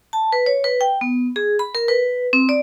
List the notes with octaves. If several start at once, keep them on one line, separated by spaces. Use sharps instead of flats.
A5
B4
C#5
B4
G5
B3
G#4
B5
A#4
B4
C4
D5